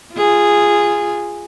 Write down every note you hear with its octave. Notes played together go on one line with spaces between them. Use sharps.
F4 G#4